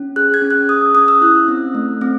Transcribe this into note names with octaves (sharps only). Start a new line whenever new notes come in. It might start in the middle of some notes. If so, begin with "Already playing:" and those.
Already playing: C#4
G#4 F#6
G#6
C#4
F#6
G#4 D#6
E6
C#4 D#6
E6
E4 F#6
C4
A3
C4